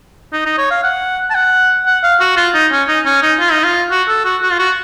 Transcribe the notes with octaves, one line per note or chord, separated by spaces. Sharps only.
D#4
D#4
C#5
F5
F#5
A5
F#5
F#5
F5
F#4
F4
D#4
C#4
D#4
C#4
D#4
F4
D#4
F4
F#4
A4
F#4
F#4
F4
F#4